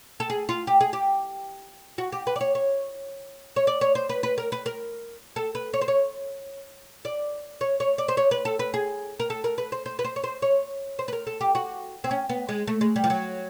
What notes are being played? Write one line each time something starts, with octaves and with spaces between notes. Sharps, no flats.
A4
G#4
F4
G4
G#4
G4
F#4
G4
B4
D5
C#5
C#5
C#5
D5
C#5
C5
B4
B4
A#4
B4
A#4
A4
B4
C#5
C5
C#5
D5
C#5
C#5
D5
C5
C#5
B4
A4
B4
G#4
A#4
A4
A#4
B4
C5
C5
B4
C5
C#5
C5
C#5
C5
B4
A#4
A4
G4
F#4
C4
C#4
B3
G#3
A3
G#3
G3
F3
F#3